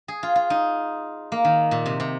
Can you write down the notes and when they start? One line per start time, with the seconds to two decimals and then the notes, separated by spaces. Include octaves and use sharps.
0.08 G#4
0.23 F4
0.35 F4
0.50 D#4
1.32 A#3
1.45 D#3
1.71 A#2
1.86 C3
2.00 C3